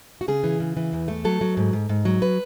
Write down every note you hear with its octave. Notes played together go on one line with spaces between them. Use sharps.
F#4
C#3 G#4
E3
C#3
E3
E2
A3
F#3 A4
F#3
G#2
G#2
G#2
F#3
B4